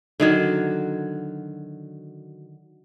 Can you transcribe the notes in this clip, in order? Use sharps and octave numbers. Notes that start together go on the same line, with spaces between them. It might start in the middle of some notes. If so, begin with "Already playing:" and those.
D3 D#3 F#3